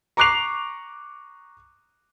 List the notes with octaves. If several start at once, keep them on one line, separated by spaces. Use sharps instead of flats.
A#5 C#6 D6 F#6 C7 F7